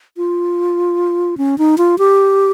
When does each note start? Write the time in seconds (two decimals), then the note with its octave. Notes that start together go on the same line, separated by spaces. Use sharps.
0.17 F4
1.37 C#4
1.58 D#4
1.78 F4
1.98 G4